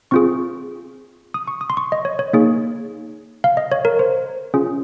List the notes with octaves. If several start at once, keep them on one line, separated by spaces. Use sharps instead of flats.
C4 F4 G#4 C#6
D#6
C#6
D#6
C6
C#6
D#5
C#5
C#5
A#3 D#4 G#4
F5
D#5
C#5
A#4
C5
C#4 F4 G#4